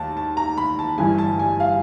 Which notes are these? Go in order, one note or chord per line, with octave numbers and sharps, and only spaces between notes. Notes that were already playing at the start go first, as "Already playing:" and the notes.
Already playing: D#2 A5
A5
A#5
B5
A5
G1 G2 E3 G#5
A5
G#5
F5